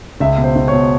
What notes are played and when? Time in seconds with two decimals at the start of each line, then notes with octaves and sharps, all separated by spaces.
0.20 C#2 E5
0.38 B2
0.44 C5
0.56 C#2
0.68 C#5
0.73 B2